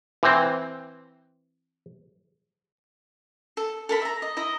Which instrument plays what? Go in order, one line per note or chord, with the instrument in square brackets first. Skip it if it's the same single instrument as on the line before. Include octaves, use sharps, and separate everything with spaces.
[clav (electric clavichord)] E3 C4
[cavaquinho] A4
A4 A#4 B5
E5 A#5
D#5
E4 D#5 A#5